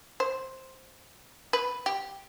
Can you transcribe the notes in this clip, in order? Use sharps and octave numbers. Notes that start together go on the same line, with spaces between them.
C5
B4
G4